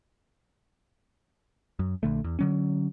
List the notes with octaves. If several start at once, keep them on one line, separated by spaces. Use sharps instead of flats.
F#2
A#1 D3 A3
E2
D3 F#3 C#4